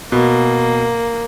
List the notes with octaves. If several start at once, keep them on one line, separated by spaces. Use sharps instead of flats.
B2 A#3